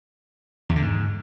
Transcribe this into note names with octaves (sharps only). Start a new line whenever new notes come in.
E2
D3
G#2